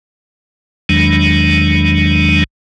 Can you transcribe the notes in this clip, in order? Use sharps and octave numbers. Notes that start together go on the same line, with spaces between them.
E2 D#3 F#3 G#3 D4